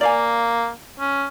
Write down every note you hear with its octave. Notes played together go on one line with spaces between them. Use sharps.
A#3 D5 F5 G#5
C#4